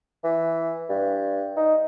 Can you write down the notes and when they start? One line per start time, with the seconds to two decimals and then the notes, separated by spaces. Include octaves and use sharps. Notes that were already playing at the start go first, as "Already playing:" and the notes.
0.24 E3
0.89 G2
1.56 D#4